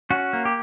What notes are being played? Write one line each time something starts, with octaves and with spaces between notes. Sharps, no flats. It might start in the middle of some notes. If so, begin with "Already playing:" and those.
C#4 F#4
A#3
G4